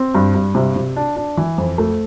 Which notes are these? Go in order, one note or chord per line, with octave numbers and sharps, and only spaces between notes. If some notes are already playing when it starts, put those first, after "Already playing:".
Already playing: C4
G2
G2
C3
C3
D4
D4
E3
F2
A3